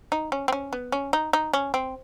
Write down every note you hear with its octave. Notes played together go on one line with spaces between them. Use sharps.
D#4
C#4
C4
C#4
B3
C#4
D#4
D#4
C#4
C4